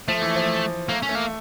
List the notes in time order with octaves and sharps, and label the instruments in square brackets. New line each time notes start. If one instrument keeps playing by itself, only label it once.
[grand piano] F3 [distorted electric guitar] A3
[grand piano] E3
F3
[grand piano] A3 [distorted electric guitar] A#3
[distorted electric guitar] C#4
[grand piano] A3
[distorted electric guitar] A#3